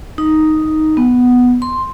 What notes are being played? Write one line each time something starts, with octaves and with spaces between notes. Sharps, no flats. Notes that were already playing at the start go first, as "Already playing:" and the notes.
D#4
B3
C6